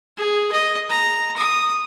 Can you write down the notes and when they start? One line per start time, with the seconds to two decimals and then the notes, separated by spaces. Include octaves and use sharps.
0.17 G#4
0.52 D#5
0.90 A#5
1.37 D#6